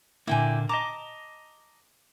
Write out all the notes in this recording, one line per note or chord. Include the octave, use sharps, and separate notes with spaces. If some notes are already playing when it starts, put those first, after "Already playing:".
A#2 D3 A#3 E4 G5 G#5
D#5 A5 A#5 D6